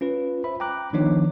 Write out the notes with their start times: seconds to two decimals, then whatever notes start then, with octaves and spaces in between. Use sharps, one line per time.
0.01 C#4 F4 B4
0.44 C5 E5 B5
0.60 G5 A#5 D6 F#6
0.93 D#3 F3 B3 D4 D#4 C#5